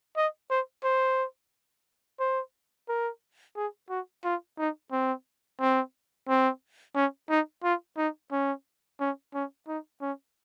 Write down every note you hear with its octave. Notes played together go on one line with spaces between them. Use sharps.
D#5
C5
C5
C5
A#4
G#4
F#4
F4
D#4
C4
C4
C4
C#4
D#4
F4
D#4
C#4
C#4
C#4
D#4
C#4